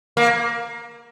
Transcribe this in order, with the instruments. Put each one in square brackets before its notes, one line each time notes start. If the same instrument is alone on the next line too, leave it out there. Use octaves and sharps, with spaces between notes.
[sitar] A#3